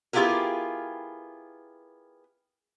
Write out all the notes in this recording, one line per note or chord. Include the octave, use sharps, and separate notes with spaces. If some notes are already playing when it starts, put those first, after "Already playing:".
B3 E4 F4 G4 G#4 A#4